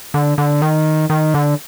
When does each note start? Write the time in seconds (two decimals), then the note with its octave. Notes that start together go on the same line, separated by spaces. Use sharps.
0.14 D3
0.38 D3
0.62 D#3
1.10 D#3
1.34 D3